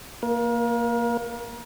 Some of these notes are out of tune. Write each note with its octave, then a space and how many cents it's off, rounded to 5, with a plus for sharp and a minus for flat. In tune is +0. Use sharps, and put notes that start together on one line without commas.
A#3 +0 A#4 +35